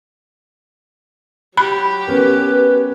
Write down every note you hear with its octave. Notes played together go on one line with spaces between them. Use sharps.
F#3 G4 B5
B3 C#4 A#4 B4